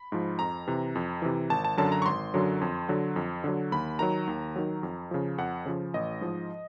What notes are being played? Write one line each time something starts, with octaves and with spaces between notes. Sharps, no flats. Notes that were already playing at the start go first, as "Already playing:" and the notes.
Already playing: B5
G#2 F3
F2 A#5
C3 E3
F2
C3 E3
G#1 A5
A5
F#2 D3 F#3 A5
A#5
C#6
G#1 C6
F#2 D3 F#3
F2
D3 F#3
F2
D3 F#3
D#2 B5
D#3 F#3 A#5
D#2
D#3 F#3
F2
C#3 F3
F2 F#5
C#3 F3
A1 D#5
G#2 F3